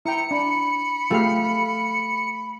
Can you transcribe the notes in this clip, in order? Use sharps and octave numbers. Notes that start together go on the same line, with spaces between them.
E4 G5 A#5 C#7
D4 B5
A3 F4 G4 G#4 F5